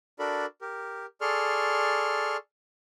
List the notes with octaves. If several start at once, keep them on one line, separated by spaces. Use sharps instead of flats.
D4 F#4 A4 A#4 D5 B5
G4 A#4
G#4 A4 D5 C6 C#6 F6